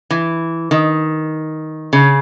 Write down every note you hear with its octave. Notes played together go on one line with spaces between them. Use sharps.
E3
D#3
C#3